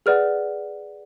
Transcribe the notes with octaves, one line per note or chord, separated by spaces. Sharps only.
G#4 B4 D5 F#5 F6